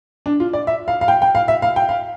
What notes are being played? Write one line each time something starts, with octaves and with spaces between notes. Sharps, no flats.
D4
F4
D5
E5
F5
F5
G5
G5
F5
E5
F5
G5
F5